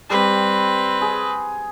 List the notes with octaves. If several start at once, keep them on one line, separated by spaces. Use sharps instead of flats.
G3 C4 B4
G#4